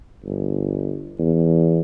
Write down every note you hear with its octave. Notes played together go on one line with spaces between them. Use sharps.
G1
E2